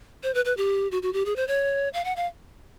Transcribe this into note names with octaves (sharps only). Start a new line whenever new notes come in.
C5
B4
B4
G4
F#4
F#4
G4
G#4
C5
C#5
F5
F#5
F5